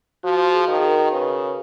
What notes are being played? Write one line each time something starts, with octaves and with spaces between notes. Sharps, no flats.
F3 F#4
G#4
D#3
G#4
A#4
C#3 B4